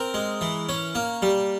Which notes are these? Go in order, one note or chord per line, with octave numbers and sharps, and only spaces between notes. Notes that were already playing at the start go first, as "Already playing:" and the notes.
Already playing: C4 A#4
G#3
E3
C#4
A#3
G3